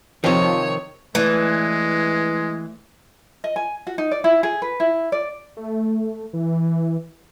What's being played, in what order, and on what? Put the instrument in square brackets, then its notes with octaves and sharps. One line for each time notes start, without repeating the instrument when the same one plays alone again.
[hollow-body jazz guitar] C3 D#3 [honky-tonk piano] F3 [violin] C#5
[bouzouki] E3 [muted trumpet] G#3 [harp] A3 D5
[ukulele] D#5
G#5
F#4
D#4
D5
E4
G#4
B4
E4
D5
[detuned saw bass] A3
E3